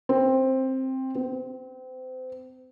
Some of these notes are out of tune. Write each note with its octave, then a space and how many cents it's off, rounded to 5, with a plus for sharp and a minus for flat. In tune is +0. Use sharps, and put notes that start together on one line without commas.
C4 +10
C4 -30